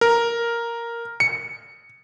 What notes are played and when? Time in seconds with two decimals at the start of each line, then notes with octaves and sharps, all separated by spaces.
0.01 A#4
1.20 C#7